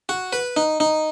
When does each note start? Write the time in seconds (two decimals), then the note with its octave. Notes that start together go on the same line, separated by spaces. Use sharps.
0.09 F#4
0.33 B4
0.57 D#4
0.80 D#4